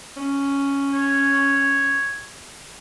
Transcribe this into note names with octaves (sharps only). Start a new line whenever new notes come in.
C#4
C#5